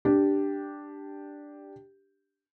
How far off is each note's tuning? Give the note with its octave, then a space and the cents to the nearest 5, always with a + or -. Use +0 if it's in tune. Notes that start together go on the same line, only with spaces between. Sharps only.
D4 +0 G4 +0